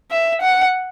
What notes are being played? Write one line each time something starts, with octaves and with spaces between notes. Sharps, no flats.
E5
F#5